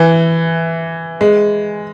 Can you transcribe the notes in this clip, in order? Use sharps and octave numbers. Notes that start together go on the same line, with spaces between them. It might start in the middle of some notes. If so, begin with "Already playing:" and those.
Already playing: E3
G#3